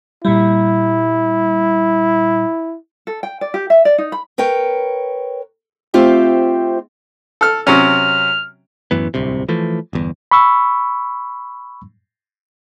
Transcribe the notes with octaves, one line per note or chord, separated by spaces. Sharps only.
A#2 G3 E4
A4
G5
D5
G4
E5
D5
D#4
B5
A#4 B4 C#5 G5
A3 C4 F4 G4 C5 E5
A4 F6
C3 F#3 C#4 F6
A1 F#2 E3 B3
D1 C2 C3
E3 F3 A3
G1 E2
B5 C#6 E6